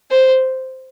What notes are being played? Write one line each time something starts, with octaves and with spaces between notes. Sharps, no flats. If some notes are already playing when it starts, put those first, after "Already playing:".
C5